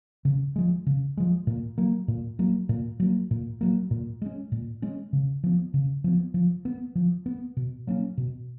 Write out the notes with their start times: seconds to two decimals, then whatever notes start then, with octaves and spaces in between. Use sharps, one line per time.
0.25 C#3
0.56 F3 G#3
0.86 C#3
1.17 F3 G#3
1.47 A#2
1.78 F#3 A#3
2.08 A#2
2.39 F#3 A#3
2.69 A#2
3.00 F#3 A#3
3.31 A#2
3.61 F#3 A#3
3.91 A#2
4.22 G#3 C#4
4.52 A#2
4.82 G#3 C#4
5.13 C#3
5.44 F3 B3
5.74 C#3
6.04 F3 B3
6.34 F3
6.65 B3
6.95 F3
7.26 B3
7.57 B2
7.87 F#3 A#3 C#4
8.17 B2